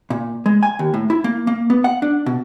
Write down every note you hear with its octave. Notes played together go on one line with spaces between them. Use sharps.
A#2
G#3
G#5
D#2
A2
E4
A#3
A#3
B3
F#5
D4
B2